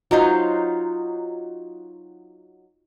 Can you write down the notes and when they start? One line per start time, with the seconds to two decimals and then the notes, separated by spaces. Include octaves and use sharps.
0.11 F#3 D#4 F4 C5